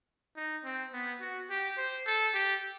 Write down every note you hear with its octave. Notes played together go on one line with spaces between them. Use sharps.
D#4
C4
B3
F#4
G4
C5
A4
G4